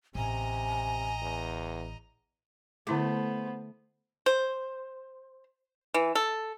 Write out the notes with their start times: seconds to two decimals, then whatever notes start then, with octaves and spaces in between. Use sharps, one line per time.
0.15 A1 C3 D#5 G#5 A#5
1.22 E2
2.87 D3 A3 B3 E4 C5 D6
4.26 C5
5.94 E3
6.15 A4